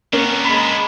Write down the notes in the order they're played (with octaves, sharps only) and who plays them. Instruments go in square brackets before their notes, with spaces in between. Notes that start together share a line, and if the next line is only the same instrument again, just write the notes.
[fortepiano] A#3 C#4 [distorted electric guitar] B3 D4
[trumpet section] G#3 A#5 B5